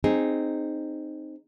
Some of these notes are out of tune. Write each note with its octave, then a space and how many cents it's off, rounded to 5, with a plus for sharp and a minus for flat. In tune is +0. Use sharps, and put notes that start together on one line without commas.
C4 +0 D#4 -15 G#4 +0